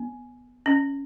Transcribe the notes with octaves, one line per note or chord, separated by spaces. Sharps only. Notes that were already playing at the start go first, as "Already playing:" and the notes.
Already playing: B3
C#4